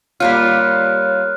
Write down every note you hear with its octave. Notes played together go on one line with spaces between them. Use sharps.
G3 A#3 F4 C#5 F6 F#6 C7